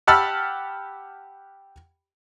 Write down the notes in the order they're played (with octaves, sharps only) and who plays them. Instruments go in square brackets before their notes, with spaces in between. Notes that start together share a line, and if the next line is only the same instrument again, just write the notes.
[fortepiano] G4 F#5 A5 B5 E6 F6